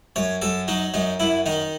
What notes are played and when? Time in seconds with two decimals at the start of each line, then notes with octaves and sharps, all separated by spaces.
0.16 F#2 C#5
0.42 F#2 A4
0.68 F#3 D#4
0.94 F#2 D#4
1.20 F#2 E4
1.46 D#3 D#4